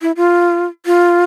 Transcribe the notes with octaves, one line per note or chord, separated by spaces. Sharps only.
E4
F4
F4